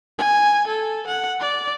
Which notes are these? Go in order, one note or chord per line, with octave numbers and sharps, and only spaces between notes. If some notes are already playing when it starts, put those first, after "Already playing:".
G#5
A4
F#5
D5